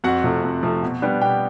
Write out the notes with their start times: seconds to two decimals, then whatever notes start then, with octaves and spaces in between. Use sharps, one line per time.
0.04 F2 F#4 F#5
0.24 C3 F3 A3
0.43 F2
0.63 C3 F3 A3
0.83 B2
1.02 G3 B3 D4
1.21 B2 G4 G5